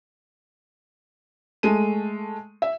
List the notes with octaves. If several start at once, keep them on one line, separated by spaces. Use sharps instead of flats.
G#3 A3 D#7
E5